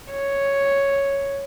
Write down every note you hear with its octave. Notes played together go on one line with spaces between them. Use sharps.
C#5